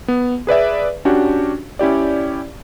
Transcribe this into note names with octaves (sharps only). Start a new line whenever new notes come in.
B3
G#4 B4 D5 E5
C#4 D4 F#4 G4
C#4 E4 G4 D5